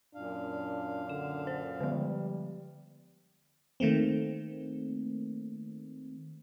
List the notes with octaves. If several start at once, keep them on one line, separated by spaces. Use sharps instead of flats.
F#2 A#2 D4 F5
D3 E7
C5
D3 F3 G3
D#3 A3 A#3 C4